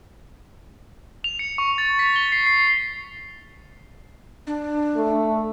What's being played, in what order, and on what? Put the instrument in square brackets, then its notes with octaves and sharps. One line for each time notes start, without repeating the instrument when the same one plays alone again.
[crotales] F7
C#7
C#6
A6
B6
G7
C7
C7
[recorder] D4
[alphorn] A3